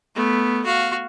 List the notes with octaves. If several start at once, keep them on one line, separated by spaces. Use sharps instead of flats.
A3 B3
F#4 F5